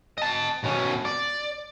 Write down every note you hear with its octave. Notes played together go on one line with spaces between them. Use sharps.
D#5 A5
B2 C#4
D5